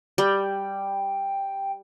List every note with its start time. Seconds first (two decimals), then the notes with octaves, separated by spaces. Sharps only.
0.18 G3 G5